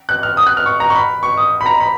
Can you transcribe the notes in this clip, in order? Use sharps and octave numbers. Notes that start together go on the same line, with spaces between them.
F#6
F6
D#6
F#6
F6
C#6
A#5
C#6
B5
C#6
D#6
B5
A#5
B5